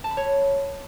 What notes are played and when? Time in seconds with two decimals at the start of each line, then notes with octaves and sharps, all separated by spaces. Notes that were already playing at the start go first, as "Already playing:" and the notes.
0.04 A5
0.11 B5
0.17 C#5